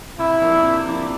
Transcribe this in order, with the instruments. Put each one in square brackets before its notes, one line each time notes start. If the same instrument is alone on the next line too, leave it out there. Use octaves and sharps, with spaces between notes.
[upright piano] C3 [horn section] E4
[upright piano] F3 A#3 D4
C3
F3 A#3 D4